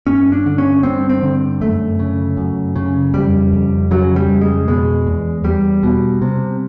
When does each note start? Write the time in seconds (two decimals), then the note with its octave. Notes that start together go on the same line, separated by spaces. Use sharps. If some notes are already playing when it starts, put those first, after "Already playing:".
0.07 G2 C#4
0.32 D4
0.46 D3
0.58 C#4
0.83 G2 C4
1.09 C4
1.23 D3
1.61 F#2 A3
1.99 C#3
2.37 F#2
2.76 C#3
3.13 F2 G3
3.53 F2
3.91 C#3 F#3
4.16 G3
4.29 F2
4.41 G#3
4.68 B2 G#3
5.07 E2
5.44 E2 G3
5.83 B2
6.22 C3